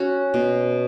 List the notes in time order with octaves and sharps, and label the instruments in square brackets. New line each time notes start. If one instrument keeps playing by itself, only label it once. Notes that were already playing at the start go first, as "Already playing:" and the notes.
Already playing: [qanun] C#4 F#4
B2